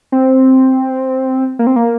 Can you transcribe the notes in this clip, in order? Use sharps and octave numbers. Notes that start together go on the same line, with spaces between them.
C4
A#3
C4
A#3